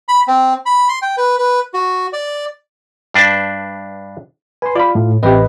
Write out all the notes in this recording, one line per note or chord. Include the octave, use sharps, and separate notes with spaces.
B5
C4
B5
C6
G5
B4
B4
F#4
D5
G2 D4 B4 C5 A5
B4 G#5 C6
F4 D5 B5
A2
A1 C4 G4 B4 D#5